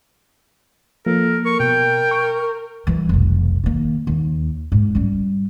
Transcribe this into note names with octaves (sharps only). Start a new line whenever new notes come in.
F3 A#3 A4 A#4
A#4 C#6
B2 G5
C#6
E3 G3
F1 B1
D#3 A#3
D#2
G#2
G3 C#4